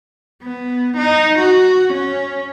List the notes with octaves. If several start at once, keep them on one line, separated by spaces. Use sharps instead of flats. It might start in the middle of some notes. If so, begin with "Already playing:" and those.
B3
D#4
F#4
C#4